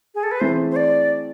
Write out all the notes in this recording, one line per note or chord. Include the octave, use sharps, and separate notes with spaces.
G#4
A4
B4
E3 A3 C4 G#4 C5
C5
D5